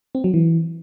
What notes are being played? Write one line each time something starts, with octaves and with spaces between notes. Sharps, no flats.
C4
F#3
E3